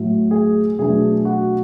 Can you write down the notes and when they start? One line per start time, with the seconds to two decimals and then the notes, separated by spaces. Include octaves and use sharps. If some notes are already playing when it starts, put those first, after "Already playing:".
Already playing: A2 F#3 A3
0.31 G#4
0.79 B2 F#3 A3 D4 G#4
1.25 F#4